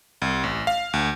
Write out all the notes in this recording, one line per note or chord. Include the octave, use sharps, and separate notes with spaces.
C2
A1
F5
D2